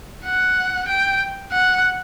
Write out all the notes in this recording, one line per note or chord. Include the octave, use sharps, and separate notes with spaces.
F#5
G5
F#5